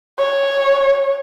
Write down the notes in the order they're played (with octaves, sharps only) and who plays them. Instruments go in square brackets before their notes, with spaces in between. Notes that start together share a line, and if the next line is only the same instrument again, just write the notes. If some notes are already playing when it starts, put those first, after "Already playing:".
[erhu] C#5